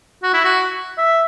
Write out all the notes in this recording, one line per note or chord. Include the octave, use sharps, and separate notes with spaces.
F#4
E4
F#4
E5